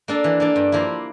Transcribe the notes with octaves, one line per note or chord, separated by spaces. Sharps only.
A#3 D4 A4
E3
A#3 D4 A4
G2
F3 A#3 E4